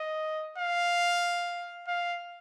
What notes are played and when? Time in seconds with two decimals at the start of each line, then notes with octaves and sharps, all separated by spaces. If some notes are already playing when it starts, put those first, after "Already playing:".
Already playing: D#5
0.58 F5
1.88 F5